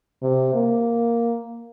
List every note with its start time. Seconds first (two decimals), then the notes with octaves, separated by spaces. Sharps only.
0.23 C3
0.54 A#3